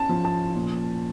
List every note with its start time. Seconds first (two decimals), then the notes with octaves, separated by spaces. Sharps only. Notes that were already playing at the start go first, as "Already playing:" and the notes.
Already playing: C#4 A5
0.09 F3
0.25 A5
0.55 A#2